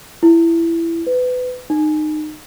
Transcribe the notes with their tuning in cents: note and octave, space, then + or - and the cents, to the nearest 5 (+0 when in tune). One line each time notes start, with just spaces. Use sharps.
E4 +15
B4 +25
D#4 -25